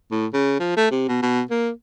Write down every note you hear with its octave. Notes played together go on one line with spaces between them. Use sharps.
A2
C#3
F3
A3
C3
B2
B2
A#3